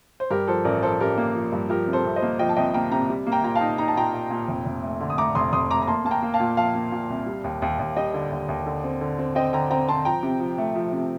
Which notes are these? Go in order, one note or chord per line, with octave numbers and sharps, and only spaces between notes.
C5
G2 G4 A#4
F3 A4 C5
A1 A#4 D5
F3 A4 C5
A1 G4 A#4
A#3
F3
G2
F3 G4 A#4
C3
A4 C5
C2
C5 D#5
A#3
F3 D#5 G5
A5
C2 D#5 G5
A#3 G5 A#5
C3 G5 A#5
G3
A#3
G5 A#5
A#2 A#5
F5 A5
D#4
D#4 A#5
A5
A#2 G5 A#5
A#2
A#2
F1
F1
A3
D3
D#6
A3 A#5 D6
F1 C6 D#6
F1 C6 D#6
A3 A#5 D6
A#5
A#3 A5 C6
A#3 A5
G5 A#5
A#3
F5 A5
A#2
F3 F5 A5
A#3
A#2
C2
G3
D#2
D#2
D#2
G3 D#5 G5
D3
D#2
D#2
D3
C4
D3
C4
C4 D#5 G5
D3 G5 A#5
C4 G5 A#5
C4 A5 C6
F3 G5 A#5
C3
F3
A3
F3
C3